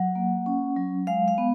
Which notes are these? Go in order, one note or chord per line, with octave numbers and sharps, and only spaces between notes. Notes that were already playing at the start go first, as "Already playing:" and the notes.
Already playing: F#3 F#5
A#3
C#4
F#3
G#3 F5
F5
B3